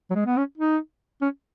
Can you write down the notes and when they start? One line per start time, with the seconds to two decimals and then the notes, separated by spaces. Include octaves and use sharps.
0.10 F#3
0.15 G#3
0.26 B3
0.37 C#4
0.58 D#4
1.22 C#4